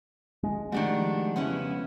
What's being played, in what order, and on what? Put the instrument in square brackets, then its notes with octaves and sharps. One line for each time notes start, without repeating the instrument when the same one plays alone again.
[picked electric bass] G#3
[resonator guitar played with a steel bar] D#3 D4 F#4 [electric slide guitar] F3 A3 G4
[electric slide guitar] F2 C#3 [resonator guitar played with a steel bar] B3 C#4 E4